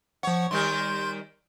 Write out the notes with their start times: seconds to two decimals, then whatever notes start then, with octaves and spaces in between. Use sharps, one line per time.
0.23 F3 C#5 F#5
0.51 D#3 G3 A#4 C6 G6